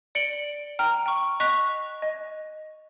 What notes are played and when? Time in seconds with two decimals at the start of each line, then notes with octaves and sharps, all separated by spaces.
0.15 D5 C#7 D7 F#7 G7
0.79 G5 A#5 F6
1.06 G5 C#6
1.40 D#5 C#6 F#6 B6 F7
2.02 D#5